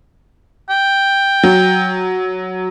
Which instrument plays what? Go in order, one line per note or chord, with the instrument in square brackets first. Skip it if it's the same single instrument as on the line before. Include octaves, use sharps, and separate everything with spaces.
[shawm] G5
[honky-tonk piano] F#3